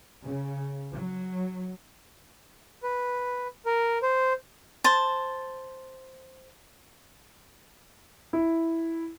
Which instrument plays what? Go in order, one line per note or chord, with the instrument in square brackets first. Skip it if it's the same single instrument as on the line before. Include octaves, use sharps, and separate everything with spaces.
[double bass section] C#3
F#3
[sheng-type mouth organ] B4
A#4
C5
[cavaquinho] C5 A5
[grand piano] E4